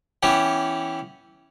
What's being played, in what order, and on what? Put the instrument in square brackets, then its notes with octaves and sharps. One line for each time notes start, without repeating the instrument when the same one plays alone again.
[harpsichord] E3 B3 C#4 G4